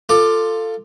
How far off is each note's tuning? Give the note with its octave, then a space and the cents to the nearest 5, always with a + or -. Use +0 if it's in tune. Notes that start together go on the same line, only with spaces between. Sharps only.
F4 +0 A4 +15 D6 +20